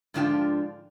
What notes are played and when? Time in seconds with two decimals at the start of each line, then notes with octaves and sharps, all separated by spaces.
0.14 G#2 D3 F3 D4 F4 G5